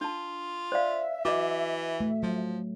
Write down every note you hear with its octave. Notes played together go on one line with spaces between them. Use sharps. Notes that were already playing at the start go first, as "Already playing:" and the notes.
D4 F4 A5
C5 D5 E5 F5
E3 F#4 D#5 D6
A3
F3 F#3